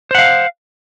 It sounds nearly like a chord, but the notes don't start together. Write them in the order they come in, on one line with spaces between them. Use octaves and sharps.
C5 F#5 F5